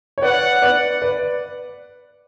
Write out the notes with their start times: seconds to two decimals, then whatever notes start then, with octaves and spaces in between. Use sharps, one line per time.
0.18 C#5
0.22 B4 D5 F#5
0.62 B4 D5
1.02 B4 D5